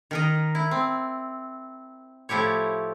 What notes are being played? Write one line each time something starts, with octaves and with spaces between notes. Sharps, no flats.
D#3 A#4 D#5
E4
C4
A2 F3 E4 G4 C#5